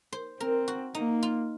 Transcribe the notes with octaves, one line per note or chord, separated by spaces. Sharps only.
C5
C4 A#4
F#4
A#3 D#4
F4